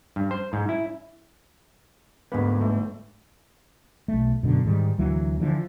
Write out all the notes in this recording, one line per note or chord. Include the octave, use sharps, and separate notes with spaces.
G2
C5
G#2
E4
D2 G#2 A#3 B3
G1 A3
B1 A3
F#2 B2 D3
G#2 D#3 G3
D2 E3 F#3 A#3
D3 E3 F3